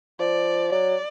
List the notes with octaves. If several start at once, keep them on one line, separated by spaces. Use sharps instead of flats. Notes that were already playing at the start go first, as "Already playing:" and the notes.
F3 D5
F#3 D5